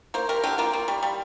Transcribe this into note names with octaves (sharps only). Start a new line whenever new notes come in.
A#3 C5
G3 A#4
D3 G4
A#3 F4
A#3
G3
G3